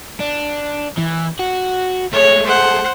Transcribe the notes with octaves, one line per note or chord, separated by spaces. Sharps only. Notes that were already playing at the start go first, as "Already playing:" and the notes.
D4
E3
F#4
G#3 A3 C#5
C5 F#5